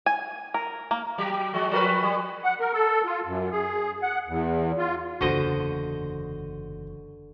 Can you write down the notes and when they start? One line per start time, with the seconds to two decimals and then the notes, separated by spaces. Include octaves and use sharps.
0.06 G#5
0.54 A#4
0.91 A#3
1.18 F#3
1.54 F3 G#3 F#4
1.71 F3 A#4 B4
2.03 G3
2.44 F#5
2.60 A#4
2.73 A4
3.05 F4
3.26 F#2
3.52 G#4
4.03 F#5
4.28 E2
4.78 F4
5.21 F#1 E2 D3 F#4 C5 D#5